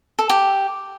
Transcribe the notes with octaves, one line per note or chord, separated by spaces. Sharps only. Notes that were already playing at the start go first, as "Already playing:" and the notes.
A4
G4